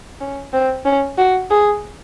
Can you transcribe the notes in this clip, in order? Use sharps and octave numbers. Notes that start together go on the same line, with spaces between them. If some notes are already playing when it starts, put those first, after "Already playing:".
C#4
C4
C#4
F#4
G#4